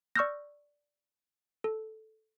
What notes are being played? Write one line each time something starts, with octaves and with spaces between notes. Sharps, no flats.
D5 C#6 E6 F6 G6 A#6
A4